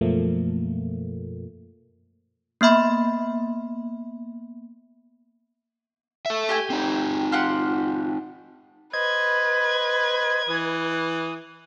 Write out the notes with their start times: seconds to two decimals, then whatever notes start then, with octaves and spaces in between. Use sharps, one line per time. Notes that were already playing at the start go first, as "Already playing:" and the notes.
0.01 F#2 B2 F3 A3 A#3
2.61 A#3 B3 E5 B5 C6
6.26 A4 E5
6.49 G4 G5 G#5
6.70 C4 D#4
7.32 F4 G4 F#5
8.93 B4 C5 D#5 G#6
10.48 E3 D#6